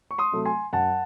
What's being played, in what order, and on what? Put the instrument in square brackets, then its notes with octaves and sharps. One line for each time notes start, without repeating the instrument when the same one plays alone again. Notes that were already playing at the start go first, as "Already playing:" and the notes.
[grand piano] C#6
C6 D#6
C3 F#3 A3
G#5 C6
F#2 F#5 A5